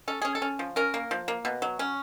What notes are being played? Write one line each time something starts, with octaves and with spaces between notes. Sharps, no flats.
C#4 A4
C#4 G#4
A4
C#4
F3
C#4 A#4
A#3
F3
A#3
B2
F#3
C#4